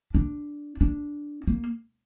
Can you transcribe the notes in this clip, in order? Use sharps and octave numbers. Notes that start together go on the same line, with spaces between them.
D4
D4
A#3